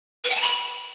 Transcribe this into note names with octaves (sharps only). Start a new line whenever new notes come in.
B4
G5
A5
B5